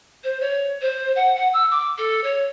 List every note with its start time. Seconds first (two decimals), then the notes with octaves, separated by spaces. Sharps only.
0.24 C5
0.40 C#5
0.81 C5
1.16 F#5
1.35 F#5
1.53 E6
1.71 D6
1.98 A4
2.23 C#5